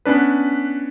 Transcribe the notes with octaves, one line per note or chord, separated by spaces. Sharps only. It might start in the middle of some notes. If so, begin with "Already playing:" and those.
B3 C#4 D4 B4